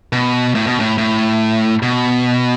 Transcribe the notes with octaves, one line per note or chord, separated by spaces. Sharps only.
B2
A2
B2
A2
A2
B2